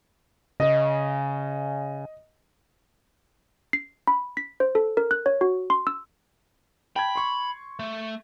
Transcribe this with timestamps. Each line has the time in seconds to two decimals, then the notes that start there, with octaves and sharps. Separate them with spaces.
0.60 C#3 D#5
3.73 C7
4.07 B5
4.37 B6
4.60 C5
4.75 A4
4.97 A#4
5.11 F#6
5.26 C#5
5.41 F#4
5.70 C6
5.87 E6
6.96 G5 A5 B5 G#6
7.16 C6 C#6
7.79 A3